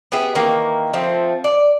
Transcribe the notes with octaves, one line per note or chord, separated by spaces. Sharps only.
B3 G4 G#4 E5
D#3 E3 A#3
F3 A3 C4
D5